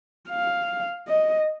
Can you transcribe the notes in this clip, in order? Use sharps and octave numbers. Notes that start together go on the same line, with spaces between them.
F5
D#5